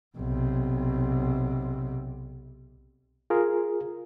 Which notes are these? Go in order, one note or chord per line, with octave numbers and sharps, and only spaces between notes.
B1 C3
F4 G#4 A#4